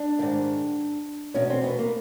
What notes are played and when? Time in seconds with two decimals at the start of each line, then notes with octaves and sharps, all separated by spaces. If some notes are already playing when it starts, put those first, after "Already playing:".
Already playing: D4
0.19 G#2 D#3
1.34 E2 B2 C#4
1.50 C4
1.64 B3
1.79 A#3